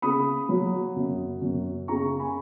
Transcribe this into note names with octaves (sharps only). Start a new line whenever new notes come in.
C#3 B5 D#6
F#3
F#2
F#2
C#3 A#5 C#6
G#5 B5